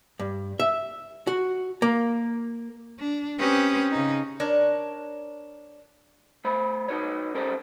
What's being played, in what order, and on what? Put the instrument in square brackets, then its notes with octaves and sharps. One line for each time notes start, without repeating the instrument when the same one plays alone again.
[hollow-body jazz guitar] G2
E5
F#4
A#3
[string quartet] D4
C4 C#4 G4 B4 D#6
C#3 D#4
[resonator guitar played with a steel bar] D4 A#4 C#5
[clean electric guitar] A3 C5 B5
D#4 F#4 B4 C#5
C#4 G4 A4 A#4 C5 D5